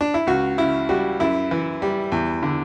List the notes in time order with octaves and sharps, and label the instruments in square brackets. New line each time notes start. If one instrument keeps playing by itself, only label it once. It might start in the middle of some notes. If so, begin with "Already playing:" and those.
[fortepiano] D4
E4
C#2 F#4
C#3 E4
G3 F#4
F#2 E4
E3
G3
E2
D3